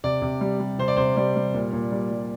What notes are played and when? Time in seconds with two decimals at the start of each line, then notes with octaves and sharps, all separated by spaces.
0.04 C3 D5
0.22 C3
0.41 G3
0.60 G3
0.79 C3 C5
0.88 D5
0.97 C3 C5
1.17 G3 D5
1.36 G3
1.54 A#2
1.73 A#2
1.92 G3
2.10 G3